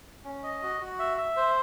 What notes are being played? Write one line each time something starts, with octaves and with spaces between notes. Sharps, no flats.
C#4
D#5
F#4
F#4
E5
E5
C5